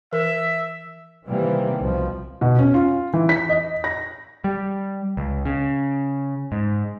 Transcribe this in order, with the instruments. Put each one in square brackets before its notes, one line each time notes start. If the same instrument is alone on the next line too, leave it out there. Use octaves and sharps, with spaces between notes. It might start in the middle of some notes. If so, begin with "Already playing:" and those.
[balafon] E3 A#4 [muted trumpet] E5
[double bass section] C3 D#3 E3 G3 A#3
C2 B2 F3
[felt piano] B2
C#4
F4
E3
B6
D#5
A#6
[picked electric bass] G3
C#2
C#3
G#2